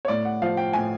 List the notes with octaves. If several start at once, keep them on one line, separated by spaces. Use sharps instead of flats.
C#5
A2 D5
F#5
F3 F5
G5
A2 G#5